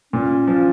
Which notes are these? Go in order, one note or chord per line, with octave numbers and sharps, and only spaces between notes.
A#2 C#4
F3